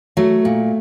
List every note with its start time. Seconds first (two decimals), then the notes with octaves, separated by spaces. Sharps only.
0.17 F#3 A3
0.45 A#2